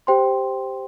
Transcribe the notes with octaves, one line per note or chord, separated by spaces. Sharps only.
G4 C5 G5 C6